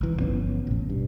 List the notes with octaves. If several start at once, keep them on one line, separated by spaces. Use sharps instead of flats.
C2 E3
G1 F3 B3 C#4
A1 B2
G2